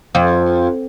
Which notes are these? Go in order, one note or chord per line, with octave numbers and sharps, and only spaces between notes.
F2